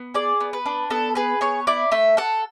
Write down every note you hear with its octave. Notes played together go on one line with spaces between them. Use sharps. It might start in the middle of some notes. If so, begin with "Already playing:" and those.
Already playing: B3
G#4 D5
B3
B4
D4
B3 A4
G#4 B4
B3 C#5
E4 D5
A3 E5
A4 F#5